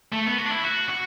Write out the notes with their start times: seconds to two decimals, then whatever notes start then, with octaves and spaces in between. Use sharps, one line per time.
0.12 A3
0.26 B3
0.38 F#4
0.46 D4
0.50 E4
0.63 F#4
0.89 F#4